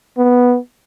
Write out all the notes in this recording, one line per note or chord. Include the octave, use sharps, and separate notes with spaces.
B3